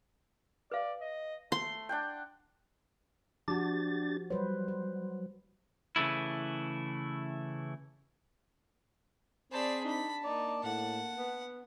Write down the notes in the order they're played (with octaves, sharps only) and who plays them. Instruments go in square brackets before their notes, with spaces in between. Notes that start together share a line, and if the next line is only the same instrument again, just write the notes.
[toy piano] B4 F5 [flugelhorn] D5
[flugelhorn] D#5
[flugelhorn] A3 [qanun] C6
[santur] D4 F#5 G5
[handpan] F3 F#4 [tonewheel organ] D4 G4 A6
[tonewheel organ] F#3 [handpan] G3 B4 C5
[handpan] C5
[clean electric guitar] C#3 E3 A3 E4
[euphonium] C4 [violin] G#4 D5 [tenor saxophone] C5 [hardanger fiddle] A5 B5
[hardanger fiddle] D4 B5 [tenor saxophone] D#4 [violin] A5
[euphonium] A#3 [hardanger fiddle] D#4 [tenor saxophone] D5
[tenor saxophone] A2 [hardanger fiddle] F#5
[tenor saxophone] B3